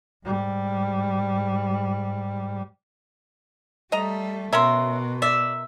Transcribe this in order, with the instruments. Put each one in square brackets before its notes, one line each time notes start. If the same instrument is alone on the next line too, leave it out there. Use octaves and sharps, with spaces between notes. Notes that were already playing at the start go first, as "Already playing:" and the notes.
[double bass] G#2 G3
[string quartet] G3 A3 [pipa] D#5 A#5
[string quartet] B2 [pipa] C#4 E5 [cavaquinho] A#4 C6
[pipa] D5 [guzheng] E5